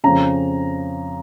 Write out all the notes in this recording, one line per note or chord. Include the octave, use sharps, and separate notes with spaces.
F2 C#3 A#5